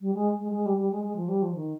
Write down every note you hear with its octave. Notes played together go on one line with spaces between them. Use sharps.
G3
G#3
G#3
G#3
G3
G3
G#3
G#3
F3
G3
F3
D#3